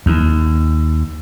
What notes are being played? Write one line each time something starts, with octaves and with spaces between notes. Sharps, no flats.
D#2